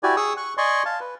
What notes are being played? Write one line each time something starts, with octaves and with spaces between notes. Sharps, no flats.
E4 F#4 G4 D5 G#5
G#4 C#6 D#6 E6
C#6 F#6
D5 D#5 G#5 C6 C#6
F5 A5
B4